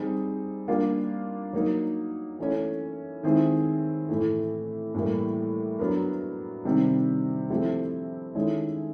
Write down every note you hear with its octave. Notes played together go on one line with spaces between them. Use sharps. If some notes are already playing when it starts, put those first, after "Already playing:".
Already playing: G3 C4 D#4 G#4
G3 A#3 D4 F4
F#3 A#3 D#4
E3 A3 C#4
D#3 G#3 C4 E4 G#4
A2 E3 A3
A2 E3 G3 A#3
F#3 B3 D4 F#4 A#4
C3 D#3 G3 C4
F3 A3 C4 E4 G4
D#3 G#3 C#4 E4 A4